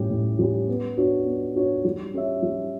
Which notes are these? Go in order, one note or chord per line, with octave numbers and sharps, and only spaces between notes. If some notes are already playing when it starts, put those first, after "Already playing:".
Already playing: A2 G3 C#4 G4
A2
G3 C#4 G4
B3
D4 F#4 C#5
B3
D4 F#4 C#5
G3
C#4 G4 C#5 E5
G3